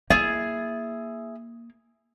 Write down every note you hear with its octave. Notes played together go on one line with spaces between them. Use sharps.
A#3 E4 G#4 D#5